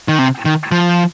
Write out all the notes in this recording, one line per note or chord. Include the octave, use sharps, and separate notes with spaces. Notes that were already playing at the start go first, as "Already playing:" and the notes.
D#3
C3
D#3
F3